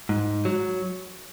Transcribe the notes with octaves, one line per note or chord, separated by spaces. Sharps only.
G#2
F#3